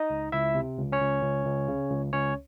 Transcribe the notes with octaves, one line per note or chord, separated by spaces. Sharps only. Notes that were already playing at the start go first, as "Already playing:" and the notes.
Already playing: D#4 D#5
C#2
C#2 E4 E5
C3
C#2
C#4 C#5
C#2
C#2
C#2
C#3
C#2
C#2 C#4 C#5